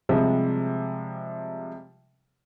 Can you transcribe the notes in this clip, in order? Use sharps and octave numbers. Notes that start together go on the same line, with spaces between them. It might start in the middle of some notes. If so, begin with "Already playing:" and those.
C3 F3 G3 G#3 C4